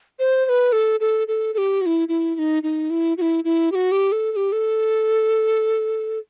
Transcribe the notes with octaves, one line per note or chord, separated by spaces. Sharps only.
C5
C5
B4
A4
A4
A4
A4
G4
F#4
E4
E4
E4
D#4
D#4
E4
F#4
E4
E4
G4
F#4
G4
A4
A4
G4
A4